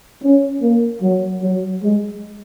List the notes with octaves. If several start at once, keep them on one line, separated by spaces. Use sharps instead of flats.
C#4
A#3
F#3
F#3
G#3